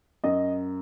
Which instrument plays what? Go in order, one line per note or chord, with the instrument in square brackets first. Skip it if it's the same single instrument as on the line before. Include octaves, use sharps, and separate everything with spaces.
[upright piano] F#2 D#5